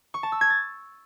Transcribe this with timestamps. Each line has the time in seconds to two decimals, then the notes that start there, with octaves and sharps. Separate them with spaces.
0.14 C#6
0.23 A5
0.32 E6
0.41 G#6
0.50 A6